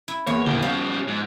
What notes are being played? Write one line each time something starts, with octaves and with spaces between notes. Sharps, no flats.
E4
E2 A#3 B4 C#5
D#1 C#3 E3 A#3 G7
F3 G3 C#4 F5
G#2